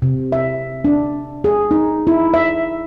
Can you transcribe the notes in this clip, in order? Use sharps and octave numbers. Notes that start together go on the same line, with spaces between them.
C3
E5
D4
G#4
D#4
E4
E5